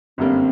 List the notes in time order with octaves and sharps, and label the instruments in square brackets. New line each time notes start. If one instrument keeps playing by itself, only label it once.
[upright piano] G1 F#2 D3 G3 A#3 [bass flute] C4